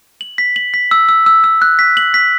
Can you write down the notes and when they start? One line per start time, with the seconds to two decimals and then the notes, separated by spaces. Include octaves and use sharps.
0.21 F#7
0.38 B6
0.56 F#7
0.74 B6
0.91 E6
1.09 E6
1.26 E6
1.44 E6
1.62 F#6
1.79 B6
1.97 F#7
2.14 B6